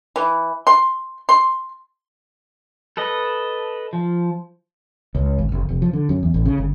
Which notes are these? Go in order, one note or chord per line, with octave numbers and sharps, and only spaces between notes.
E3
C6
C6
A4 B4 D#5
F3
C#2
G#1
F#1
F1
F3
D3
F#2
E2
A1
C#3
G1